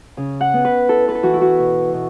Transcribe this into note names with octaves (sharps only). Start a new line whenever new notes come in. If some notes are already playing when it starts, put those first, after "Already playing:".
C#3
F#5
B3
B4
E4 A4
B4
A4
E3 F#4
E4
F#4
B2
B2